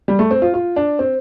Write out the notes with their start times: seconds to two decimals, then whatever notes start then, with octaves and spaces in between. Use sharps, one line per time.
0.08 G3
0.19 A3
0.31 C4
0.42 F4
0.54 F4
0.76 D4
0.99 C4